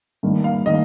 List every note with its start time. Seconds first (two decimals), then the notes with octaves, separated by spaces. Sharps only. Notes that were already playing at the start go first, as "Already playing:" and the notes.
0.23 G2 D#3 A#3
0.44 F5
0.66 D#3 A#3 D#5